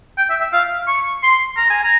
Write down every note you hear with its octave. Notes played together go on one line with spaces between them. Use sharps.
G5
E5
E5
F5
C#6
C6
A#5
G#5
A#5